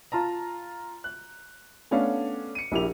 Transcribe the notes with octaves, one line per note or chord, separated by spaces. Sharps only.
F4 A5 A#5
F#6
A3 B3 C#4 D4 C#5 F5
C#7 D#7
A#1 E4 G4 A#4 F7